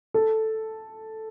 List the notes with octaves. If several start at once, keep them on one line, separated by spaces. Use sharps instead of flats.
A4